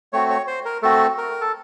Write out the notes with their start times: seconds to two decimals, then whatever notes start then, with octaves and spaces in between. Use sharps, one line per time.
0.13 A3 C4 F#4 C#5
0.30 C#5
0.47 C5
0.65 A#4
0.82 A3 C4 F#4 A4
1.18 A#4
1.41 A4